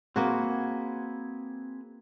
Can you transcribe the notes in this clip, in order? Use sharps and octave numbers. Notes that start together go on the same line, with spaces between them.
A#3 C4 F#4 G#4 B4